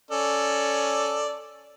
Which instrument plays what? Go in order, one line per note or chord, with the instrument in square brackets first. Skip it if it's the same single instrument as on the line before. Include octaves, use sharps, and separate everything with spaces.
[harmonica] C#4 A4 D5